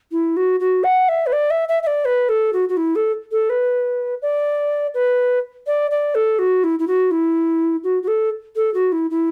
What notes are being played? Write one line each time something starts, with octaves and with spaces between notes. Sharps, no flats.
E4
F#4
F#4
F#5
E5
B4
D5
E5
E5
E5
D5
B4
A4
F#4
F#4
E4
A4
A4
B4
D5
B4
D5
D5
A4
F#4
E4
E4
F#4
E4
F#4
F#4
A4
A4
F#4
E4
E4